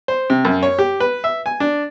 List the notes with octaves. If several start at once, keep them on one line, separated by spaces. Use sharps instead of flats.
C5
C3
F#2
C#5
G4
B4
E5
G#5
D4